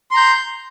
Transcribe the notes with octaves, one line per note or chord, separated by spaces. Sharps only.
A#5 C6 G6